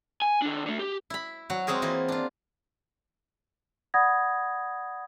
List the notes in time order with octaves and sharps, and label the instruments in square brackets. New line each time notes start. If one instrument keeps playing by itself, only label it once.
[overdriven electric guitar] G#5
D#3 D4
D3 A3
G4
[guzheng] E4 B5
F#3 F#4
G#3 C4 F#4 G#4 A#4
E3 A#3 F4 A#4
D4 F4
[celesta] D5 F#5 B5 D#6 G#6 A#6